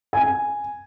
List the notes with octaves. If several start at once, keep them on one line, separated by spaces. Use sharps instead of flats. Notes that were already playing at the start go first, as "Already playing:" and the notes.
G#5